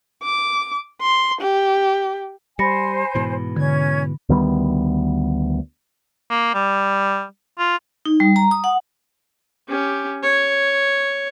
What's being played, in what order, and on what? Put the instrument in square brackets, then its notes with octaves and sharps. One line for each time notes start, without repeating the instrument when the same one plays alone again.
[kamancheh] D6
C6
G4
[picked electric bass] G3 [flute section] C5 G#5 [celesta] B5 A#6 C#7
[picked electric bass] G#2 B2 E3
[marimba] D3 [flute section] C#4 G#6
[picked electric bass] D2 D#3 G3 B3
[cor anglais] A#3
G3
F4
[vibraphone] D#4
G3
A#5
D#6
F#5
[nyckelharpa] C#4 G4
C#5